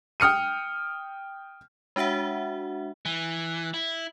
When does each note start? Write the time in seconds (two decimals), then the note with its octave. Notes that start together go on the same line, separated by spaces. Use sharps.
0.20 G5 D#6 F6 C#7 D#7
1.96 G#3 D4 F#4 E5 F#5
3.05 E3
3.74 E4